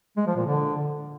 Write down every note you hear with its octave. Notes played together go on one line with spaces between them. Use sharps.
G#3
F3
A#2
D3